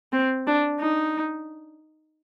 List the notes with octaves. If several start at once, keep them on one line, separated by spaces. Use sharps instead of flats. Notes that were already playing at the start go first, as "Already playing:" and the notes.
C4
D4
D#4